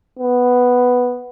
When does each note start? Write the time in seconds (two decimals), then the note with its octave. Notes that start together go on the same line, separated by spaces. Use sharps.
0.19 B3